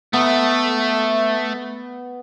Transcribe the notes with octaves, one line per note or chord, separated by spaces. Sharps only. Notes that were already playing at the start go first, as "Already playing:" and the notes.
A3 B3